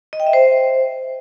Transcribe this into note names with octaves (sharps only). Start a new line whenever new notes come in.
D#5
G5
E5
C5